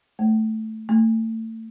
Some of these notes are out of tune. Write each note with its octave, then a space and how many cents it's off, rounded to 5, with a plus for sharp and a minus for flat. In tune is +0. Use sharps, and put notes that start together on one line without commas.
A3 +0
A3 +30